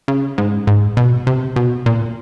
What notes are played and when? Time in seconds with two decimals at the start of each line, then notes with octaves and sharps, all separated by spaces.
0.08 C#3
0.38 G#2
0.67 G#2
0.97 B2
1.27 C3
1.56 B2
1.86 A#2